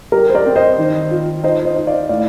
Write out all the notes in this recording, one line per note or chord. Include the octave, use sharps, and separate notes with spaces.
G3 G4 A#4
C5
A#4 D5
C4
C5 D#5
D#3
F4
D#4 C5 D#5
C5 D#5
D#4
D5 F5
A2 D5 F5